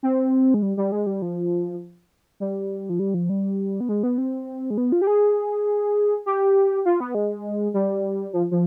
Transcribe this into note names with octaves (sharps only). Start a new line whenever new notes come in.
C4
G#3
G3
G3
G#3
G3
F3
G3
F3
G3
F3
G3
B3
G#3
B3
C4
G#3
B3
F4
G4
G#4
G4
F4
B3
G#3
G3
F3
F3